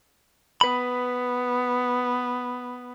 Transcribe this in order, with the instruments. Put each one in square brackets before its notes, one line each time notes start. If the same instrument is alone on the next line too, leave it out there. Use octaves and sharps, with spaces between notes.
[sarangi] B3 [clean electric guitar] B4 B5